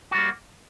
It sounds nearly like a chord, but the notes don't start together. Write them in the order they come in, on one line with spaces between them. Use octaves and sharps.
F#4 G3 A#3